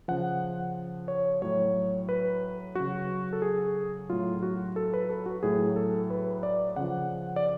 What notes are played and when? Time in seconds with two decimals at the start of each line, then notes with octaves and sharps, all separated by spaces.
0.08 C#3 F3 F#5
1.08 C#5
1.42 A2 F#3 C#5
2.09 B4
2.75 C#3 F#3 F#4
3.33 A4
3.42 G#4
4.10 A2 F#3 F4
4.43 F#4
4.76 A4
4.94 B4
5.10 A4
5.26 F#4
5.43 A2 F#3 G#4
5.76 A4
6.10 B4
6.43 D5
6.76 C#3 F3 F#5
7.36 D5